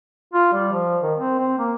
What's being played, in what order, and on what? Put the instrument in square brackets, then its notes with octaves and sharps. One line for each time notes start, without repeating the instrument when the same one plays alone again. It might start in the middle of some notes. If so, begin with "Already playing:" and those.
[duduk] F4
G3
F3
D#3
C4
C4
A#3